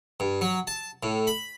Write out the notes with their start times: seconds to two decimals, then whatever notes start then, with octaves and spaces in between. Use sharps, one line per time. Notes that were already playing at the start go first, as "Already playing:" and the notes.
0.20 G2
0.41 F#3
0.67 A5
1.03 A2
1.27 B5